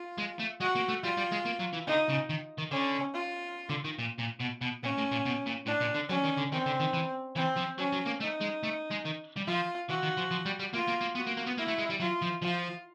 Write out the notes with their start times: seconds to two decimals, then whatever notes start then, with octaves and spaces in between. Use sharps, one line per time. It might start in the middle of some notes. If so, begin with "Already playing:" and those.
Already playing: F4
0.18 G#3
0.40 A3
0.60 G#3 F#4
0.75 A#3
0.88 A3
1.03 G3 F4
1.17 G3
1.31 G#3
1.45 A#3
1.59 F#3
1.73 E3
1.87 D3 D#4
2.09 C#3
2.30 D#3
2.58 D#3
2.71 D3 C#4
3.13 F4
3.70 D3
3.84 D#3
3.99 A#2
4.19 A#2
4.41 B2
4.61 B2
4.83 A#2 C#4
4.97 A2
5.11 A#2
5.26 B2
5.47 A#2
5.67 A2 D4
5.81 A#2
5.95 D3
6.09 F#3 C#4
6.23 D#3
6.37 D3
6.52 D#3 C4
6.66 D3
6.80 D#3
6.93 E3
7.36 E3 C4
7.57 F3
7.78 F#3 C#4
7.93 F#3
8.06 A#3
8.21 A3 D#4
8.41 G#3
8.63 A3
8.90 G#3
9.05 D#3
9.36 G3
9.47 F3 F4
9.89 E3 F#4
10.03 D#3
10.17 F3
10.31 F3
10.45 G3
10.60 G3
10.74 A#3 F4
10.88 A#3
11.01 A#3
11.15 B3 F#4
11.27 A#3
11.37 A#3
11.47 B3
11.58 A#3 E4
11.68 A3
11.79 G#3
11.90 G3
12.00 F#3 F4
12.22 F3
12.42 F3 F4